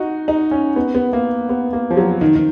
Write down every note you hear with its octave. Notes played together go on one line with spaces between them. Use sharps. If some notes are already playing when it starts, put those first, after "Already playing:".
Already playing: D#4 F#4
D#4
C#4
B3
B3
A#3
B3
A#3
F3
F#3
D#3
D#3